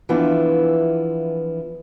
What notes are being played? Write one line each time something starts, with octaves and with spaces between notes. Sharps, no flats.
E3 F3 B3 D4 E4 F4